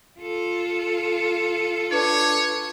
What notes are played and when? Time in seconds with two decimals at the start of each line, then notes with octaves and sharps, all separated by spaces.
0.20 F4 A4
1.92 D4 B4 C#5